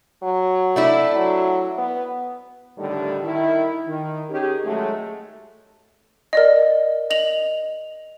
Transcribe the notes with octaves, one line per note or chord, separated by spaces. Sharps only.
F#3
A3 D4 E4
F#3
B3
A2 D3 D#3 G3
D#3 E4
D#3
D#3 C#4 D#4 G4 G#4
F#3 G#3 A3
A#4 D5 D#5
D#5 F7 F#7